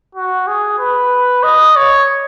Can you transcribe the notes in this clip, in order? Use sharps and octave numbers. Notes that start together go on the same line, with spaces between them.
F#4
G#4
B4
D#5
C#5